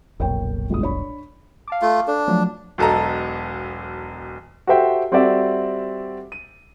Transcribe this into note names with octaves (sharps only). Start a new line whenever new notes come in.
F1 B1 A#2 A#4 C#5 G5
G1 G#3 D#6
D4 C#5 B5
F5 A5 D6
A3 F4
D4 A4
F3 F#3 A3
E1 B1 A4 D#5 A#5
F#4 G4 A4 C5 E5 G5
G3 C4 F#4 A4 D5 E5
D#7